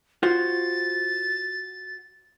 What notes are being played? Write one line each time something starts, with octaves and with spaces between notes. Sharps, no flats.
F4 F#4 C5 A6